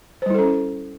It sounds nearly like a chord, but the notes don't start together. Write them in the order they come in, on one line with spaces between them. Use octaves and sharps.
C5 G3 E4 A4 C#4